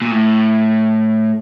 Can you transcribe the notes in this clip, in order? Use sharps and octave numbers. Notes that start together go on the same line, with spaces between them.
A#2
A2